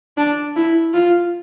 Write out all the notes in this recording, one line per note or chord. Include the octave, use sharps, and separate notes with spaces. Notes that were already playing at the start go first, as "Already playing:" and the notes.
D4
E4
F4